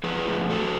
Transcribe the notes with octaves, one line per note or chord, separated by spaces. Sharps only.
F3 G#4 B4
A2
A2 F#4 A4